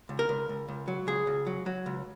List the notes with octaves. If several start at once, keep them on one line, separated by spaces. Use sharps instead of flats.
C#2
A#4
C#2
C#2
C#2
F#3
C#2 G#4
C#2
F#3
F#3
C#2